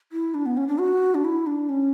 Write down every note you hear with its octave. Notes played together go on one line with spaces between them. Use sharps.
E4
D4
B3
C#4
D4
F#4
D4
E4
D4
C#4